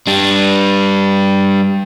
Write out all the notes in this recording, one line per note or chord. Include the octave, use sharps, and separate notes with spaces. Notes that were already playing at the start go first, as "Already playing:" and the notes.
G3 D4